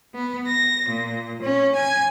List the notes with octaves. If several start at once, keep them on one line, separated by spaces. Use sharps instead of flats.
B3
A#6
A#2
C#4
G#5